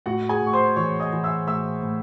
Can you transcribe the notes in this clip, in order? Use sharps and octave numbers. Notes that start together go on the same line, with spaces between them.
A2 F#4 F#5
G#4 G#5
A2 C#6
C5 C6
E3 C#5 C#6
D#5 D#6
E3
E5 E6
A2 E5 E6
A2